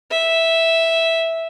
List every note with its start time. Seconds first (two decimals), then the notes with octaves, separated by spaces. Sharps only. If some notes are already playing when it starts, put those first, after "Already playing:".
0.11 E5